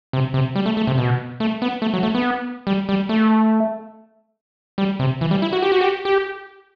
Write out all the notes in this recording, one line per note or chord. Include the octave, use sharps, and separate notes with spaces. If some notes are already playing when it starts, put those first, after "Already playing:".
C3
C3
G3
A3
A3
C3
B2
A3
B3
A3
F#3
A3
B3
G3
G3
A3
G3
C3
E3
G3
E4
F#4
G4
F#4
G4
G4